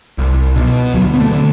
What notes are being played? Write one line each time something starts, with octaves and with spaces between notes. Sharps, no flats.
C2
B2
D2 F#3
B3
A3
D3